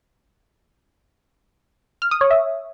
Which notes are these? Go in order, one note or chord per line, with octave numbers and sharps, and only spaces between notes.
F6
D#6
C#5
E5